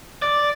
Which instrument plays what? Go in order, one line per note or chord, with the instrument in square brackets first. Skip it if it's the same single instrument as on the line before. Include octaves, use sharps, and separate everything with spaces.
[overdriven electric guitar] D5